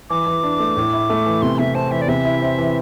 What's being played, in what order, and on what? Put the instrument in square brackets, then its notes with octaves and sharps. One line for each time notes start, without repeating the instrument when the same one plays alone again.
[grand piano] E3 [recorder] D6
[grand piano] E3
D4
A3
A2
E4
A3
E3
[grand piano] C3 [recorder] C6
[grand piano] C3 [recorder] E5
[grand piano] C4 [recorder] A5
[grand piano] E3 [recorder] E5
[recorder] D5
[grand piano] C3 [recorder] E5
[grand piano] E4
C4
E3